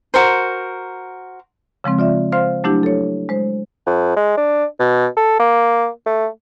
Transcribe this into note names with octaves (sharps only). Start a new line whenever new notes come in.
F#4 A#4 C5
C#3 F3 G#3 C4
F4 D5 E5
C5 F5 C6 F6
F#3 A3 D4 E4 G4
A4 C#5
G#3 C5
F2
G#3
D4
B2
A4
A#3
A3